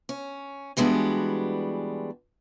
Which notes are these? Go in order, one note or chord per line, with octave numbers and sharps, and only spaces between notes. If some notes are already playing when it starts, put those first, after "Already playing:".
C#4
E3 G3 G#3 B3 D4 F#4